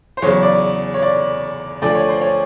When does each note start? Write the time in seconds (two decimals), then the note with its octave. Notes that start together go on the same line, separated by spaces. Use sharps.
0.17 C5
0.22 E2 C#3 F#3 C#5
0.43 D5
0.94 C#5
1.02 D5
1.82 D2 D3 F3 D5
1.95 C#5
2.08 C5
2.21 C#5